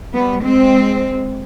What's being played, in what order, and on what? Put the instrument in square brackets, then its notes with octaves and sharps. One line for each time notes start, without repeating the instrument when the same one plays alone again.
[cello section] G3 B3
G#3 C4